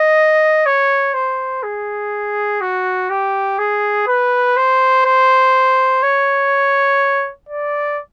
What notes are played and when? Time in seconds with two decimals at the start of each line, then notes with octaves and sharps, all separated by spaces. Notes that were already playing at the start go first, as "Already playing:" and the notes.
Already playing: D#5
0.66 C#5
1.14 C5
1.63 G#4
2.61 F#4
3.10 G4
3.59 G#4
4.07 B4
4.56 C5
5.05 C5
6.03 C#5
7.49 D5